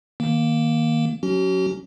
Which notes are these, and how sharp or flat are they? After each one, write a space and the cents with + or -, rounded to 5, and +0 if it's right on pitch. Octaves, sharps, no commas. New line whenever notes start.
D#3 +5 A#3 +5
F#3 -20 C#4 +10 F#4 +40